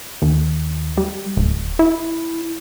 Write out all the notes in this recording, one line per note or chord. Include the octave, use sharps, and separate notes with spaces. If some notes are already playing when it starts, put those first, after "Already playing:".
D#2
G3
D1
E4